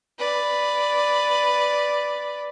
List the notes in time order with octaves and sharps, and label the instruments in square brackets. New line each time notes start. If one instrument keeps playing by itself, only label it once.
[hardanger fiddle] B4 D5